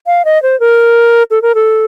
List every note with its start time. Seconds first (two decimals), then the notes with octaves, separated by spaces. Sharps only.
0.07 F5
0.25 D#5
0.43 C5
0.60 A#4
1.31 A4
1.42 A#4
1.55 A4